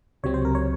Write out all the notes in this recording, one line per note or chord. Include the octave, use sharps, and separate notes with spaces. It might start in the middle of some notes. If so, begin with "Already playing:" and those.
C#2 C3 F#3 C4 C#5
C5
A#4
C#5